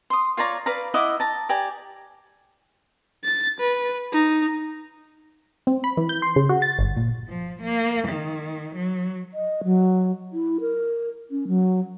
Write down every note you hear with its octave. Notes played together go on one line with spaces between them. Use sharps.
C6 D#6
F4 C#5 D5 A#5
B4 D5 F5 A#5
E4 D#5 F#5 D6
A5 A#5
G4 D5 G#5 A#5
A6
B4
D#4
C4
B5
E3
G6
C6
C#3
F#4
A6
G1
A#2
F3
A#3
D#3
F#3
D#5
F#3
E4
A#4
C#4
F#3